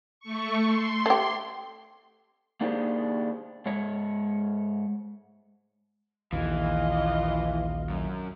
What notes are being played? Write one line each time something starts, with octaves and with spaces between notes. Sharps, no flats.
A3 C#6
C6
A3 G4
A#3 D4 D#4 G4 G#4 C5
G#2 G#3 C#5
A#1 D#2 E3 F4 D#5
F#2